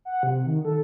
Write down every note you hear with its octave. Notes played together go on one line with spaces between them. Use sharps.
F#5
C3
D#3
A4